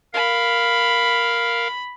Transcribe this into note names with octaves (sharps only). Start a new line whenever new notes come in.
A#4 F5 B5